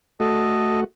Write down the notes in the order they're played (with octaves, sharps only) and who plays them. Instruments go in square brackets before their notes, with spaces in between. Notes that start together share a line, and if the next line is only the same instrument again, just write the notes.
[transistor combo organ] A3 F#4 [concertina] A4 D#5